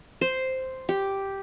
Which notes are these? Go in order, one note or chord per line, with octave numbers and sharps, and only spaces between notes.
C5
G4